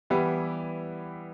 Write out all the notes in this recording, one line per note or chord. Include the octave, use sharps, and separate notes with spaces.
E3 G3 B3 E4 G4